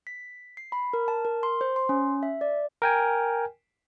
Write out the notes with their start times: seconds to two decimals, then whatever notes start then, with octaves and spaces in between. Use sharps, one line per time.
0.07 B6
0.57 C7
0.72 B5
0.93 A#4
1.08 A5
1.25 A#4
1.43 C6
1.61 C5
1.76 C6
1.89 C#4
2.23 E5
2.41 D5
2.82 A#4 G5 G#5